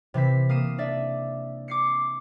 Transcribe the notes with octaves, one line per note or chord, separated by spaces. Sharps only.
C3 E3 C4 B6
A#3 D#6 C7 D#7 E7
D4 D5 E5
D6 C7 C#7